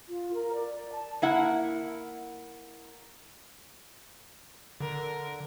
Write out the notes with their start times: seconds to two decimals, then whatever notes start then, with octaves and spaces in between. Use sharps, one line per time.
0.09 F4
0.34 A#4
0.53 D5
0.92 A5
1.22 A#3 E4 F#5
4.80 D3 A#4